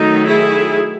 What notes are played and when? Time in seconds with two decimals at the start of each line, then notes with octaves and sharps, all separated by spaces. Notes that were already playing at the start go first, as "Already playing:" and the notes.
Already playing: D#3 F#3 A3 D#4
0.26 E4 G#4